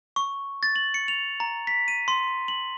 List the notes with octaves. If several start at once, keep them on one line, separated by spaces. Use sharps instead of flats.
C#6
A6
F#7
C#7
F7
A#5
B6
D#7
C6
F#7